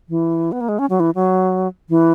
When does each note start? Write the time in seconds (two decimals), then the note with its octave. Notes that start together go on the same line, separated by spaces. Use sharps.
0.09 E3
0.52 B3
0.61 A#3
0.69 G#3
0.79 C#4
0.90 F#3
1.00 E3
1.15 F#3
1.89 E3